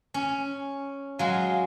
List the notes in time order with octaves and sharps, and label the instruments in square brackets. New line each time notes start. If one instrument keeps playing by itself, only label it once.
[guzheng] C#4
[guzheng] F#3 G#3 [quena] F5